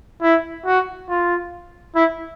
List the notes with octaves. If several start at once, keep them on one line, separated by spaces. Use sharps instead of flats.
E4
F#4
F4
E4